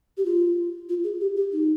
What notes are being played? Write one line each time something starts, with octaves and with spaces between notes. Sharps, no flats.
G4
F4
F4
G#4
G4
G4
D#4